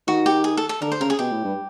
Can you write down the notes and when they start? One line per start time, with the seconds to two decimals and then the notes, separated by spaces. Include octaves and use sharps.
0.07 D#3 F#4
0.26 G4
0.44 G#4
0.57 A4
0.69 A4
0.81 D3 A#4
0.92 C5
1.01 C#3 A#4
1.10 G#4
1.19 B2 G4
1.32 A2
1.44 G2